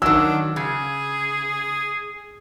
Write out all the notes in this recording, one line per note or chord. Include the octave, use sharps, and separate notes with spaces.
D#3 F#3 D4 E6
C#3 G#4